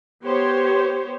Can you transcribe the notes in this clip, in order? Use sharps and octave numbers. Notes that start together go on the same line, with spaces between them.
B3 G4 C5 C#5